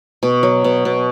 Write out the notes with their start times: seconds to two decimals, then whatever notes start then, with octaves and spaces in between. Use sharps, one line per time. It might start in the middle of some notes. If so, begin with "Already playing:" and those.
0.23 B2
0.43 F#3
0.64 B2
0.85 B2